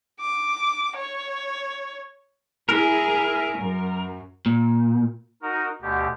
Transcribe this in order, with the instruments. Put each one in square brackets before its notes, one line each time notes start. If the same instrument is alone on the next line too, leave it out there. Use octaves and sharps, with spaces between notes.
[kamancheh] D6
C#5
[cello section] E4 G#4 [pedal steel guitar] A#4
[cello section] F#2
[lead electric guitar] A#2
[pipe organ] D#4 F#4 A#4
D2 B2 G4